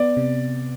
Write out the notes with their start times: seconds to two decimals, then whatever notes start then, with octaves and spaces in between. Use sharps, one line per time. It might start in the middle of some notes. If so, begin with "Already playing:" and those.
Already playing: B3 D5
0.17 C3